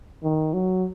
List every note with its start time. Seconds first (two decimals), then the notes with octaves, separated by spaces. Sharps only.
0.24 D#3
0.54 F#3